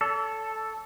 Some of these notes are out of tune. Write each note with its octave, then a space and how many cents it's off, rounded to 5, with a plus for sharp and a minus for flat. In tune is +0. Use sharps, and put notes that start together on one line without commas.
A4 +0 C#5 +45